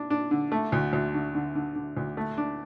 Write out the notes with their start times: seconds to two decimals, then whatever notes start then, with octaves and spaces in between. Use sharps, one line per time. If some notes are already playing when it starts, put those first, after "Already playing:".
Already playing: D4
0.10 D4
0.31 D3
0.52 A3
0.72 D2
0.93 D2
1.14 D3
1.35 D3
1.55 D3
1.75 D3
1.97 D2
2.17 A3
2.38 D4